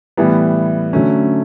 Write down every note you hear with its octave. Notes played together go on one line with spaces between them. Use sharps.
A2 E3 G3 B3
D3 F#3 A3 C#4